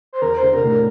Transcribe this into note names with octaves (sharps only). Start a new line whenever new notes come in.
C5
E2 A#4
C5
D3
C3 A#4
A2
A#4